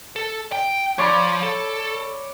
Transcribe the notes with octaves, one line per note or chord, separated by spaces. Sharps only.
A4
G5
F3 C#5 D5 B5
A4